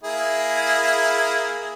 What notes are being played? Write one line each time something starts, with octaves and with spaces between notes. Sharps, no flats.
A#3 E4 G#4